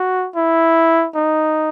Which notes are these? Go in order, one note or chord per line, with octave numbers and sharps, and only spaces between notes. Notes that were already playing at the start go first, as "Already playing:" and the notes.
Already playing: F#4
E4
D#4